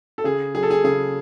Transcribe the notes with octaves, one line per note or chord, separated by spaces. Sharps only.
A4
C#3 G#4
F#3 G#4
A4
G#4
C#3 G#4